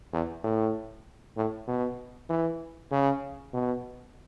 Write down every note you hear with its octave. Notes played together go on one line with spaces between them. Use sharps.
E2
A2
A2
B2
E3
C#3
B2